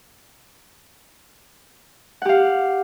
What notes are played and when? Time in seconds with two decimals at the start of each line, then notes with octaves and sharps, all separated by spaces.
2.22 F#5
2.25 G4
2.29 F5